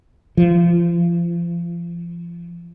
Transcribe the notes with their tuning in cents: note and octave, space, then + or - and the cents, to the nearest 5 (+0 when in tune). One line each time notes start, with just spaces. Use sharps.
F3 -30